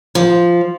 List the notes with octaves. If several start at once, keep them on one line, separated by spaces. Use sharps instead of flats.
F3